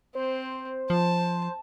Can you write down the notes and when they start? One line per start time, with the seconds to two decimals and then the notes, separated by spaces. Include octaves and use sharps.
0.15 C4 C5
0.90 F3 A5